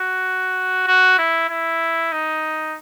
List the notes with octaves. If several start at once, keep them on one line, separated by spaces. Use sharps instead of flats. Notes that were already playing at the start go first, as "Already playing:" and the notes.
Already playing: F#4
F#4
E4
E4
D#4